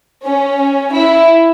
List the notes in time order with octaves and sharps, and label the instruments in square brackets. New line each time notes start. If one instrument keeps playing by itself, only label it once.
[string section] C#4
E4